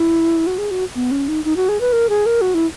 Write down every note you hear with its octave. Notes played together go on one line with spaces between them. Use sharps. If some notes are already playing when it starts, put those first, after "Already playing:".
Already playing: E4
F#4
G#4
F#4
B3
C#4
D#4
D#4
F#4
G#4
B4
A#4
G#4
A#4
F#4
E4